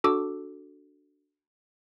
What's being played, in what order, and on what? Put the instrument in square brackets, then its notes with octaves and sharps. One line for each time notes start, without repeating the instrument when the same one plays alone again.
[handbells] D4 F#4 A4 D6 E6